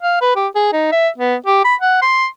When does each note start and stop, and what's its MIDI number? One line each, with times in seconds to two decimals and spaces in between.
0.02 0.19 77
0.21 0.35 71
0.36 0.48 67
0.55 0.69 68
0.73 0.89 63
0.92 1.08 76
1.18 1.35 59
1.46 1.63 67
1.64 1.75 83
1.81 1.99 78
2.02 2.27 84